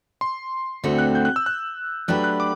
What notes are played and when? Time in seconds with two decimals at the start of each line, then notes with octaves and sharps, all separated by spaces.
0.21 C6
0.84 D2 D3 A3 C4 F#4
0.99 F#6
1.15 G6
1.25 F#6
1.36 E6
1.46 F#6
2.08 F#3 A3 D4 G4 B4 F#6
2.24 F#6
2.40 D6